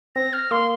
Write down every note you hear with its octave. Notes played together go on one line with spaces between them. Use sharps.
C4 A#6
F6
A#3 C6